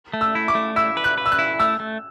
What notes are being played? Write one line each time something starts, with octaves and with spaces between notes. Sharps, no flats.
A3
E6
E4
D6
A3
E4 E6
B4
F#6
B4
E6
F#6
E4
A3 E6
A3